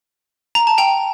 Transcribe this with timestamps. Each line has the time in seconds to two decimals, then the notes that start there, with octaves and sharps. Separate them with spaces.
0.55 A#5
0.67 A5
0.78 G5 A#5